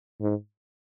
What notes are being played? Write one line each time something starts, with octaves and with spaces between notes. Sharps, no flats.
G#2